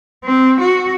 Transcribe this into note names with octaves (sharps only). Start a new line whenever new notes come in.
C4
F#4